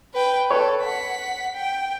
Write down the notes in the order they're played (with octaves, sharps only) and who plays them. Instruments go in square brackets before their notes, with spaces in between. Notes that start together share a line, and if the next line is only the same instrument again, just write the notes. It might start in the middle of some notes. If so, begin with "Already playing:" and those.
[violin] B4 G5
[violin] A4 [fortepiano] B4 C#5
[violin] F#5 B6
G5